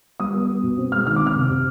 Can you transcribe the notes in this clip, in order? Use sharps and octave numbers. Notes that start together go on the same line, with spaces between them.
G3 D#6
B3
B3
B2
C4
G#3 F6
D#3 F6
D6
C4
F6
C3
C3